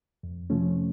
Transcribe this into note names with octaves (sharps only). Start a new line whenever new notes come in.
F2
C3 F3 A3 C#4